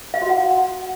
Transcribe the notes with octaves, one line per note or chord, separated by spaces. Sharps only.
F5
F#4
F#5